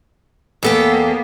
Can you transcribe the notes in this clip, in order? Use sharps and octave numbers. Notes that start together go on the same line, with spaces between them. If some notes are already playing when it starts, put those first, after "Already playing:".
E2 A#3 B3 A4 G5